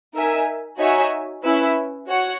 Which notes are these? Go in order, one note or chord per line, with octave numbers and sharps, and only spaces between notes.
D#4 A#4 E5 G#5
D#4 F#4 C#5 E5 G#5
C#4 E4 B4 E5
F#4 C#5 F#5